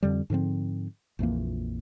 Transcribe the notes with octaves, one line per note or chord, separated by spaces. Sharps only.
F2 D3 G3
G#2 D3 F3 C4
A#1 F2 E3 A#3